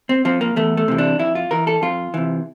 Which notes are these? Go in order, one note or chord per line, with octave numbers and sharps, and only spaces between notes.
C4
F3 C4
A#3
E2 A3
A3
C3 E3
D4
F2 E4
F4
E3 A#4
A4
F2 F4
C3 E3